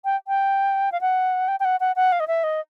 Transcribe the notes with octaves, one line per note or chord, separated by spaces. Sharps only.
G5
G5
F5
F#5
G5
G5
F#5
F#5
F#5
F5
D#5
E5
D#5